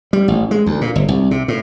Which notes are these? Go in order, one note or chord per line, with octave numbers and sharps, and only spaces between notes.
G3
A1
G#3
D2
A#2
G1
C2
C3
A2